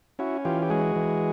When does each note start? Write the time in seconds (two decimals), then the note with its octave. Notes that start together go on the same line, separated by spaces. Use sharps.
0.19 C#4 E4 F#4
0.45 E3 F4 G4
0.62 G4
0.70 G#3 F#4 G#4
0.96 E3